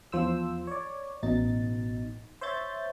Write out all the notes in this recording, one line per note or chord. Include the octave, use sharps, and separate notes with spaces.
E2 F3 C5 E6
C#5 D5
A1 B2 D#4 A6
C5 C#5 E5 G6 A6